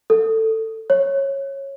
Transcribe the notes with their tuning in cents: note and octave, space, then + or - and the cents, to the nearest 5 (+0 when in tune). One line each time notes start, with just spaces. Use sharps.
A4 +15
C#5 -15